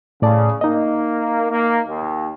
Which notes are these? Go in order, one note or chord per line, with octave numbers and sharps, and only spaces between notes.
A2 C#3 D5 A5
A#3 D#4 D#5
A#3
D#2